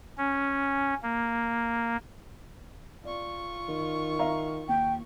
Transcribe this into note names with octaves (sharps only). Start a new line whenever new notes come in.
C#4
A#3
F4 D5 C#6
D#3
E5 F5 A#5
D#2 G5